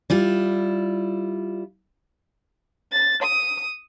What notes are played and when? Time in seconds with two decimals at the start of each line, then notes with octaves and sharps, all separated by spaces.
0.10 G3 E4 F4
2.92 A6
3.23 D#6